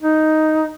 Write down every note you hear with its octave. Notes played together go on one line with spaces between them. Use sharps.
D#4